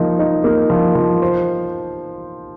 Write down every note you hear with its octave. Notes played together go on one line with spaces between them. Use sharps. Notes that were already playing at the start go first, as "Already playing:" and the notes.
Already playing: F3 A#3 D#4
D#4
A#3
F3
F3
C5